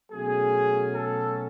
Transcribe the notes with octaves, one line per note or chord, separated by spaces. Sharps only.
B2 F#3 A3 C#4 G#4
A4